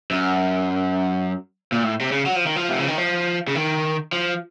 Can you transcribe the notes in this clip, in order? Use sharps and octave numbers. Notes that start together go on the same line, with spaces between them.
F#2
A#2
A2
C3
C#3
F#3
F3
D#3
F3
C3
C#3
D#3
F3
C#3
D#3
F3